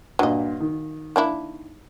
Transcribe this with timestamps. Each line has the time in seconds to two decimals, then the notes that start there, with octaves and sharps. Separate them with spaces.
0.19 G2 A#2 F#3 D#5
0.60 D#3
1.16 A#3 D4 E4